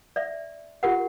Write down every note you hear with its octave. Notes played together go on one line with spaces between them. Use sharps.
D5 E5
F4 G4 A#4 F#5